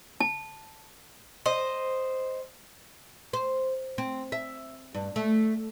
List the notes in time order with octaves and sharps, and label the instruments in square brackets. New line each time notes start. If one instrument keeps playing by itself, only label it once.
[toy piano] A5
[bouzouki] C5 D#5
[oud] C5
C4
E5
G2
A3